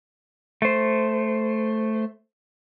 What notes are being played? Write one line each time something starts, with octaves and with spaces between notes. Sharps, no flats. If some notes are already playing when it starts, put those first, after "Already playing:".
A3 C5